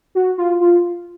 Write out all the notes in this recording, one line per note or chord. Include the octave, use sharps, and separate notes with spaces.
F#4
F4
F4